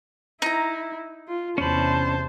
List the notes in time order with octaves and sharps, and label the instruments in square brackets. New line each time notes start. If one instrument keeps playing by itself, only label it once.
[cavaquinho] D#4 A#5 [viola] E4
[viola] F4
[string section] E2 C3 [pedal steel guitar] C#4 D4 B5 [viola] C5 A5